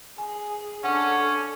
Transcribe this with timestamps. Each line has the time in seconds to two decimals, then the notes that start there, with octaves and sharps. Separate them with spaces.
0.18 G#4 G#5
0.84 C#4 D4 A4 F#5